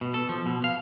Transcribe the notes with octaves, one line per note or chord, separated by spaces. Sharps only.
B2
A4
F3
B2
F5